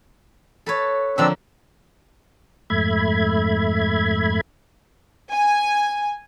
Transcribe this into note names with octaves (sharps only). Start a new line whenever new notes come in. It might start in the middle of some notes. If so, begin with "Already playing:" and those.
A4 B4 C#5
D3 F3 A#3 C4 D4 E6
F2 G#2 A3 E5 B5 G#6
G#5